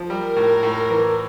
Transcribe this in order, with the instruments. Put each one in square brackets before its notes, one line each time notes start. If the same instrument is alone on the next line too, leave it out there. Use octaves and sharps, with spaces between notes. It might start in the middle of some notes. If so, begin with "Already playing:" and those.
Already playing: [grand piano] F3
[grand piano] G3 [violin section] A#4
[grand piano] A2
A2
E3